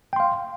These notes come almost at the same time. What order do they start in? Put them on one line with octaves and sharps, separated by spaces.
G5 C6 F5